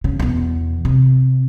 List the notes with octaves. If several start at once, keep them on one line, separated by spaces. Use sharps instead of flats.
C#3
E2 B2
C3